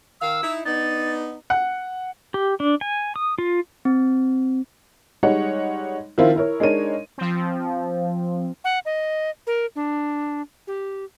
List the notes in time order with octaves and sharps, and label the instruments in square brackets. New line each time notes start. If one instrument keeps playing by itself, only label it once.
[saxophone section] D#3 F5 [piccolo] E6
[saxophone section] D#4 E4
[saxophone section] B3 D4 D#4 [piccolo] A6
[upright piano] F#5
[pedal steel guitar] G4
D4
G#5
D#6
F4
[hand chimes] C4
[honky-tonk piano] G3 G#3 D#4 C#5 F#5
D#3 F3 C4 E4 F4 A#4
E4 A#4 C#5
G#3 D4 D#4 A#4 C#5 D#7
[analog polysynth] F3 C4
[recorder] F#5
D#5
A#4
D4
G4